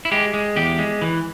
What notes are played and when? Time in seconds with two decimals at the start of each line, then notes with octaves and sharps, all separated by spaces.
0.05 E4
0.11 G#3 G4
0.34 G#3
0.56 E2 G4
0.79 G#3
1.02 E3